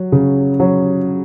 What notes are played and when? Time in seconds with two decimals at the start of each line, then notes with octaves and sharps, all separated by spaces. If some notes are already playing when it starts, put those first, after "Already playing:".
Already playing: F#3
0.12 C#3
0.60 F#3